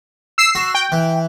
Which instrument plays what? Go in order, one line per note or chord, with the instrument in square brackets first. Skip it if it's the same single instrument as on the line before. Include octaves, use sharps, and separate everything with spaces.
[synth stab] E6 C7
[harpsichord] F#4
[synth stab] G5
[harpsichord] E3